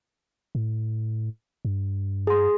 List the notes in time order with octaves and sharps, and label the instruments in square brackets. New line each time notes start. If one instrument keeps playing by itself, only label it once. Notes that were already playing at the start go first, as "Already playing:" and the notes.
[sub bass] A2
G2
[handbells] G#4 C6